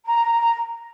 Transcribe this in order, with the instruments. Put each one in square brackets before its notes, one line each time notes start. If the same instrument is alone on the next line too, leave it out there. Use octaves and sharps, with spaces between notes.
[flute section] A#5